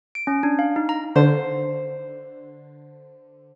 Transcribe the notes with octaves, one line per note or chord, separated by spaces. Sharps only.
D7
C#4
D4
F5
D#4
A#5
D3 C5